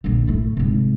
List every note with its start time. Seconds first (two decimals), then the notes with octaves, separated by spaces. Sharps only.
0.04 A#1 D3
0.27 A2 A3
0.57 G#2 C3